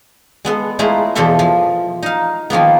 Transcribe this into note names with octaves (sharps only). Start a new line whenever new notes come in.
G#3 B3 A4
G#3 A3 E4 F4 A#5
E2 B2 F3 A4 E5 C6
F3
D#4 F5
D#3 F3 A#3 B3